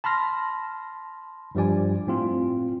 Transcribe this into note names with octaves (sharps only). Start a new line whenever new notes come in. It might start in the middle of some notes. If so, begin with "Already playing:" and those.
A5 B5 C6 F6 A#6
G2 F3 G3 D5 G#5
A2 C4 F4